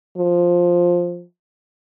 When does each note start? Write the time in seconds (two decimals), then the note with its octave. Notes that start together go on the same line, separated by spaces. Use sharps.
0.17 F3